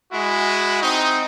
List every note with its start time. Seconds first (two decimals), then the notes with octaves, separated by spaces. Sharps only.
0.12 G#3 E4 F#4
0.82 C4 D#4